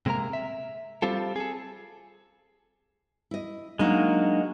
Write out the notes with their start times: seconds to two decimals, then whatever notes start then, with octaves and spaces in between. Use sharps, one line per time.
0.06 C3 G#3 A#3 A#4 A#5
0.33 E5
1.02 G3 C4 F4 A4
1.36 G#4 A4
3.31 E4 D#5
3.79 F#3 G#3 A#3 D4 D#4 F#4